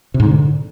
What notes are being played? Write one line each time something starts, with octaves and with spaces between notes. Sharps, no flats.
C3
G#2
D3